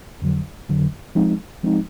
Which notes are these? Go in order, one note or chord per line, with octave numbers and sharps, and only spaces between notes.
F2 D3 F#3
F2 D3 F#3
F3 G#3 C4 D#4
F3 G#3 C4 D#4